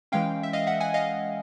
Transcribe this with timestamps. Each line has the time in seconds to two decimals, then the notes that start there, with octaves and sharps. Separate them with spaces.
0.12 E3 G#3 C#4 F5 G5
0.43 E5
0.53 D#5 F5
0.67 E5 F#5
0.80 F#5 G#5
0.94 D#5 F5